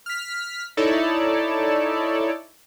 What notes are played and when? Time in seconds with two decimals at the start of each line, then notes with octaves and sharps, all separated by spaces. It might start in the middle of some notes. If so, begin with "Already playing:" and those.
0.06 F6 B6
0.77 D#4 E4 A4 C#5 D5 A5